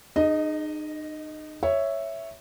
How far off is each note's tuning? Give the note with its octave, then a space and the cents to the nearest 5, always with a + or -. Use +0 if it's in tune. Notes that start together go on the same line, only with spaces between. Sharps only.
D#4 -35 G#4 +0 D#5 +0
C#5 +0 E5 +0